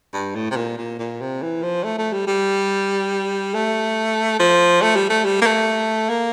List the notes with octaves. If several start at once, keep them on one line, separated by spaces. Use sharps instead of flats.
G2
A2
C3
A#2
A#2
A#2
C3
E3
F3
A3
A3
G3
G3
A3
F3
A3
G3
A3
G3
A#3
A3
A#3